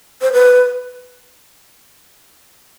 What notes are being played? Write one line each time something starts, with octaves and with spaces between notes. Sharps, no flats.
C5
B4